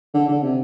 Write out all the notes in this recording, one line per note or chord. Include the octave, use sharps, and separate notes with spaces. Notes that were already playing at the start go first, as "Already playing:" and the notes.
D3
D3
C3